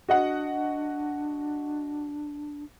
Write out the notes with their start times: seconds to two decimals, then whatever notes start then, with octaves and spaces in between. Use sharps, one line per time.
0.09 D4 F#4 D#5 F#5